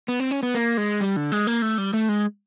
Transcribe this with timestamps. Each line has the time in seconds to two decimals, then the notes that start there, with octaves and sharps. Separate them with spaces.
0.08 B3
0.20 C4
0.31 C#4
0.43 B3
0.55 A#3
0.77 G#3
1.00 G3
1.16 D3
1.32 G#3
1.47 A#3
1.62 A3
1.78 G3
1.93 A3
2.09 G#3